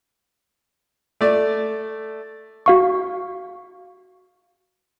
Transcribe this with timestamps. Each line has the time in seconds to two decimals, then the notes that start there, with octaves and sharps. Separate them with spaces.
1.21 A3 D5
2.66 F#4 F5 C#6